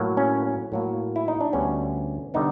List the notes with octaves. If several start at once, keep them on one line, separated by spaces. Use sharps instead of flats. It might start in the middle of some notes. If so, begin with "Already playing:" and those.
Already playing: A2 F#3 A#3
C#4
A2 F#3 A#3
E4
D#4
D4
D2 D3 G3 B3 C#4
D3 G3 B3 D#4